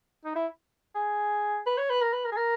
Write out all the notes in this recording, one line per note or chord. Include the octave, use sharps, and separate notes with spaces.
D#4
E4
G#4
B4
C#5
B4
A#4
B4
A#4
G#4
A#4